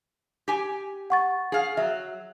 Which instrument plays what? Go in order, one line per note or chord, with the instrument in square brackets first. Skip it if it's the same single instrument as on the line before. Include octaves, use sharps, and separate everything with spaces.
[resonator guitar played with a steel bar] G4 G#5
[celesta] F#5 C#6 A6
[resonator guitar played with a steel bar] G#4 F5
[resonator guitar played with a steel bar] F#3 [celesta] E5